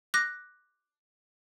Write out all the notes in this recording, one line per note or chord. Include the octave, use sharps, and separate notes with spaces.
D6 F#6 A#6